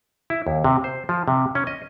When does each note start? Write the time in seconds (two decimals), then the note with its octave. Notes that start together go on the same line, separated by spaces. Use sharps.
0.30 E4
0.47 D#2
0.64 C3
0.84 C5
1.09 F3
1.28 C3
1.55 C#4
1.67 D#5